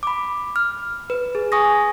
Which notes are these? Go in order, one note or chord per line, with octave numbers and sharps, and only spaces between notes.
B5 D6
F6
B4
G#4
G#5 C#6 D#6 A#6